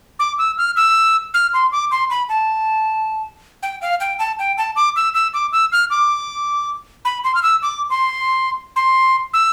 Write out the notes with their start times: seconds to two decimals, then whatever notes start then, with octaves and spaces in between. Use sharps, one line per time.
0.19 D6
0.38 E6
0.58 F6
0.76 E6
1.34 F6
1.53 C6
1.72 D6
1.91 C6
2.10 B5
2.29 A5
3.62 G5
3.82 F5
4.00 G5
4.19 A5
4.39 G5
4.58 A5
4.76 D6
4.96 E6
5.14 E6
5.34 D6
5.52 E6
5.72 F6
5.90 D6
7.05 B5
7.24 C6
7.35 F6
7.43 E6
7.62 D6
7.90 C6
8.76 C6
9.33 E6